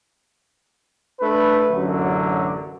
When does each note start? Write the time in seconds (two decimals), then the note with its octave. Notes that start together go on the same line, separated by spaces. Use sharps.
1.20 A3 D4 B4
1.70 A1 F#2 D3 F#3